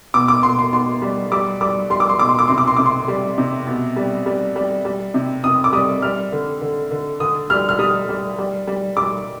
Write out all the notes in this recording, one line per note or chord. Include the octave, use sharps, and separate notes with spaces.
B2 D6
D6
B2 C6
C6
B2 C6
G3
G3 D6
G3 D6
G3 C6
D6
C6
B2 D6
C6
D6
C3 C6
D6
C6
C3 D6
C6
G3
C3
B2
G3
G3
G3
G3
C3
C3 D#6
D6
G3 D#6
G3 F6
D3
D3
D3
D3 D#6
G3 F6
F6
G3 D#6
G3
G3
G3
G3 D6